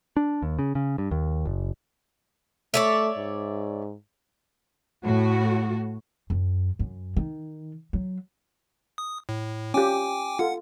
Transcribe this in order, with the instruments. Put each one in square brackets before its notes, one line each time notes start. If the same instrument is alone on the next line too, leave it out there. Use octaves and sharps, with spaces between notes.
[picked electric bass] D4
D#2
C#3
C#3
G2
D#2
F#1
[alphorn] A3 [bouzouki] C#5 D5 E5
[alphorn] G#2
[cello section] A2 F#4
[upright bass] F#2
F#2
D#3
F#3
[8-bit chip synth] D#6
A2
[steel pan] C#4 F4 G4 [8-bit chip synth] G5 G#5 D6
[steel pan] F4 A4 [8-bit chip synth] F#5